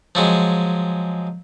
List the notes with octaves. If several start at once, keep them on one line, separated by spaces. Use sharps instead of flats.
F3 F#3 G#3